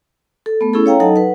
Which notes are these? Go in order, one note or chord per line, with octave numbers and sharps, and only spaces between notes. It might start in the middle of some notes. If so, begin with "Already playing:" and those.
A4
A3 B3
C#4 E4 G#4 A4
C#5 F5 G5 A#5
F#3 D#4 A4 D#5 F#5 A5
B4 F#5